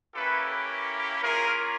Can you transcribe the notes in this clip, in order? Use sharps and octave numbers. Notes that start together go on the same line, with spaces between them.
A#3 C#4 E4 G4 A4 B4
A#3 C#4 F4 G#4 A#4